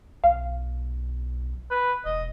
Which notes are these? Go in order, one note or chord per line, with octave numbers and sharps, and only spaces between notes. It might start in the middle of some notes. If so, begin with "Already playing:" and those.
B1 F5
B4
E1 D#5